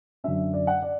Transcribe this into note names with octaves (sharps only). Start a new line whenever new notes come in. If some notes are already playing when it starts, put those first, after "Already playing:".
F#2 D3 F#3 C#4 E5
D5
F#5
D5